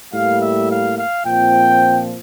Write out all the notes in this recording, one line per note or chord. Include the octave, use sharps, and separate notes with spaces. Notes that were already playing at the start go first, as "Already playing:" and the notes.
A2 G3 A#3 F5
E5
F5
F5
A#2 F3 C4 G5